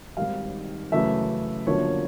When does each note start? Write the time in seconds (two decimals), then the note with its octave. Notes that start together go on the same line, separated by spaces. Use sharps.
0.17 G#1 G#2 D#3 G3 F5
0.92 F#2 C#3 E3 A3 E5
1.67 G1 F#2 D3 F3 A#3 C#5